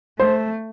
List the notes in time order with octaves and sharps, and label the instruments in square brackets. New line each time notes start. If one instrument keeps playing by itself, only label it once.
[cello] A3 [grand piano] C5